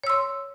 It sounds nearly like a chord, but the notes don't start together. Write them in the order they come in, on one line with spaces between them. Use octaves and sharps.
C#5 E6 C6